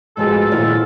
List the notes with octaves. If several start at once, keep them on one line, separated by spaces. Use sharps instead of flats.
G#2 B2 F3 G#4 A4
A#2 D#3 F3 E4